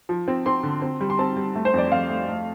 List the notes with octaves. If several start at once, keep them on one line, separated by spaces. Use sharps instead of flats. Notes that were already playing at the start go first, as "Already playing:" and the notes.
F3
C4
C4 C6
D3
C4
G3
C6
C4 A5
G3
A3
C5
F2 D5
F2 F5
A3
A3